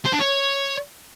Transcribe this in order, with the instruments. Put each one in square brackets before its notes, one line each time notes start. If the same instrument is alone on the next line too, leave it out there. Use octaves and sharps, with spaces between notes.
[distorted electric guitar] C5
D4
C#5